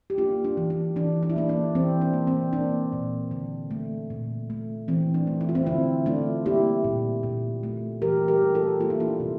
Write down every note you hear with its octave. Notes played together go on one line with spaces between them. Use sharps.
G4
A#3 D4 F4
D4
E3
D4
E3 D4
D4
E4
A#3 D4
D4
E3 C4
D4
A#3
C4
A#3 D4
A#2
D3
A3
A#2
A3
E3 C4
D4
A3
E4
F4
C4 E4
D3 C4 E4
A3 D4 F4
A#3 E4 G4
A#2
A#2
A3
E3 G4 A#4
G4 A#4
A3
F4 A4
A#3 F4
E4
D4 F4
C3